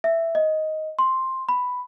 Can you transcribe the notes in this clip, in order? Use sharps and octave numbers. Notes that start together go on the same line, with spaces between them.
E5
D#5
C6
B5